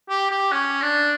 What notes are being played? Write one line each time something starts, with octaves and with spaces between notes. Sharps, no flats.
G4
G4
C#4
D4